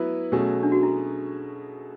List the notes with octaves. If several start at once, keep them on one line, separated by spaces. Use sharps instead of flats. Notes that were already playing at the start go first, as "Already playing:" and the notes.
Already playing: F#3 B3 E4 B4
B2 F#3 A3 C#4 G#4
D4
F#4
E4